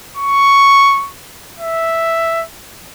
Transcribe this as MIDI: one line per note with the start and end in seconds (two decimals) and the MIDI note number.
0.17 1.10 85
1.60 2.44 76